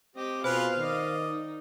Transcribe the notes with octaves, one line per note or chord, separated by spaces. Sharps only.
C4 G4 D#5
B2 F4 G#4 B4 C5 F5
D#3 D5 D#5
D#4